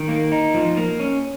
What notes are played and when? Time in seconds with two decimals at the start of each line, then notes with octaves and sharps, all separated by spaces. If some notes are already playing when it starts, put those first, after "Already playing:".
Already playing: D#3
0.08 A#3
0.32 D#4
0.54 F3
0.77 A#3
1.00 C#4